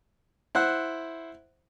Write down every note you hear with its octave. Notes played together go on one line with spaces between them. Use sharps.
E4 C5 F#5 F#6